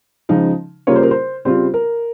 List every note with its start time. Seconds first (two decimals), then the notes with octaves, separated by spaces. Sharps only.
0.29 C#3 F3 G#3 D#4
0.87 C#3 G3 A#3 F4 C#5
0.96 C5
1.03 A#4
1.11 C5
1.45 C#3 G3 C4 F4 C5
1.74 A#4